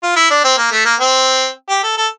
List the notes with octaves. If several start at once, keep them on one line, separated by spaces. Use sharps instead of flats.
F4
E4
D4
C4
A#3
A3
A#3
C4
G4
A4
A4